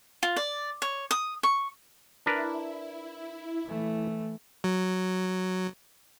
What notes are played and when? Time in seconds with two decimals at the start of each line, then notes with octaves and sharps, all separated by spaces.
0.23 F4
0.36 D5
0.82 C#5
1.11 D#6
1.43 C#6
2.26 D4 E4 A#4 B4
3.66 E3 A3
4.64 F#3